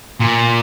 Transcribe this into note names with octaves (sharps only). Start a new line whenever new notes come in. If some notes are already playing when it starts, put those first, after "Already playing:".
A#2